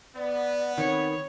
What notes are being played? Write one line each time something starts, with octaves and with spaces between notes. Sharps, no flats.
B3 D5
D#3 C4 C#5